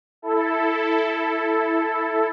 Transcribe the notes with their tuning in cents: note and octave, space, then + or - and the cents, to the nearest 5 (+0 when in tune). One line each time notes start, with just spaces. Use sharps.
E4 +0 A4 +0